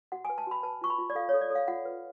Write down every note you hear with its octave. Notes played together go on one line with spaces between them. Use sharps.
F#4 F#5
B4 G#5
A5
F#4 B5
B4 A5
F4 C#6
B5
F4
D5
A4 F5
A4 C#5
D5
A4
F5
F4 F#5
B4